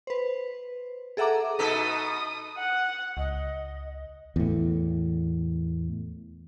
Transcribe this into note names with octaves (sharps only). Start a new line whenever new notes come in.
B4 C5
G#4 A4 E5 F#5 A#5 D6
B2 D#4 A4 D#6
F#5
C#2 D#5
E2 A2